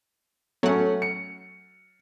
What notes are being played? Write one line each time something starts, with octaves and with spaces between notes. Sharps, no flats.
F#3 A3 C#4 F#5
C#7